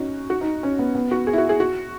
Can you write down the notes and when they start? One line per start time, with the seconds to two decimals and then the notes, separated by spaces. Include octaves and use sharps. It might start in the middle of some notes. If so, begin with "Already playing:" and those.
Already playing: C#4 D#4 F#4
0.30 F#4
0.41 D#4
0.63 C#4
0.79 B3
0.95 B3
1.11 F#4
1.27 G#4
1.33 E4
1.38 F#4
1.49 G#4
1.60 F#4